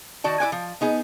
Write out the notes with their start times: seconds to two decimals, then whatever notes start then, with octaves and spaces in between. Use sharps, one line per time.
0.24 D#3 F#4 D5 A5
0.40 E4 F#4 D5 G#5
0.52 F3
0.81 B3 D#4 G#4